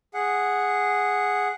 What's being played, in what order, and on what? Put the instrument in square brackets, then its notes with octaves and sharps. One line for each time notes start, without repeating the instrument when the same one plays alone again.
[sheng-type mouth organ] G#4 F#5